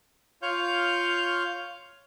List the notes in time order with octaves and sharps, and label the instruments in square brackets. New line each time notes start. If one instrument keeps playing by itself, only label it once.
[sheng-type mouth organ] F4 C#5 F5 C#6 F6 G6